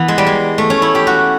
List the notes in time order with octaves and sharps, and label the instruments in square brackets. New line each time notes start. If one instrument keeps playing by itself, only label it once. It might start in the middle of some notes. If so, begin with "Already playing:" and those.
Already playing: [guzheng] E3 B3
G#3
G3
G#3
A3
C#4
E4
G4
F#4